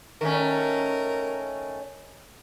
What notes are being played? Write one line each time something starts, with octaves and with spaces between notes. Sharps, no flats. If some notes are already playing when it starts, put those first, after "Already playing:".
D#3 A3 C#4 A#4